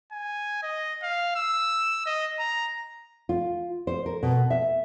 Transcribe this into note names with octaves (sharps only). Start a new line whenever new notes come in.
G#5
D#5
F5
E6
D#5
A#5
F4
C5
A#4
B2
E5